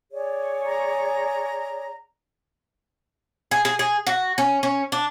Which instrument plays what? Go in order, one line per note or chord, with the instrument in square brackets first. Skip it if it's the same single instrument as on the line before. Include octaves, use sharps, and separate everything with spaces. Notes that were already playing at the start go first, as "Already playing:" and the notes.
[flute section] G#4 C#5 D5
[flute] A#5
[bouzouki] G#4
G#4
G#4
F#4
C#4
C#4
D4